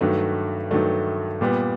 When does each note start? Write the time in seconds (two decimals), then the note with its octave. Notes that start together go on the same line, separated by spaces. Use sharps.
0.01 G2 D#3 F#3 A3
0.71 G2 D#3 F#3 A3
1.41 A#2 G3 B3